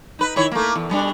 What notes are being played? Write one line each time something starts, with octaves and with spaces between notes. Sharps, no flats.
D#4 B4
D#3 E4 C#5
A3 A#3
E2
B2 G3 D4